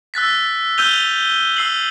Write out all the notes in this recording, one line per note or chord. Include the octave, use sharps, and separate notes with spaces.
E6 F#6 A6 B6
E6 F#6 G6 D#7 F7 G7
E6 C7 F#7